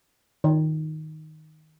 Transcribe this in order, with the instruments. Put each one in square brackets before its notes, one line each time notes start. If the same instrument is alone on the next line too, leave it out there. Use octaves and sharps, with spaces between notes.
[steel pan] D#3